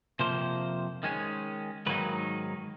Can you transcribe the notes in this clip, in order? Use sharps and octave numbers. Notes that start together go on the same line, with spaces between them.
F2 C3 F3 A#3 C5
D#3 G#3 C#4
G#2 D#3 F#3 A#3 D#4 B4